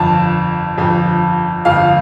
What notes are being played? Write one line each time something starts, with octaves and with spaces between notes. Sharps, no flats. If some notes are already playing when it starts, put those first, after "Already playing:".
Already playing: G1 F2 F3 A5
G1 F2 F3
G1 F2 F3 F5